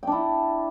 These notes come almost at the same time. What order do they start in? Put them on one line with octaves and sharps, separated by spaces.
G5 D4 E4